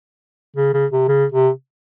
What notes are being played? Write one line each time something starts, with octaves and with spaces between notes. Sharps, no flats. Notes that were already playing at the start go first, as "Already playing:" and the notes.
C#3
C#3
C3
C#3
C3